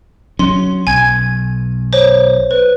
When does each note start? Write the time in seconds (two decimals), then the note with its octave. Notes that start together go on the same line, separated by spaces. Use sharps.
0.39 F#3 C#4 C6
0.87 B1 G#5 G#6
1.93 C5 C#5
2.51 B4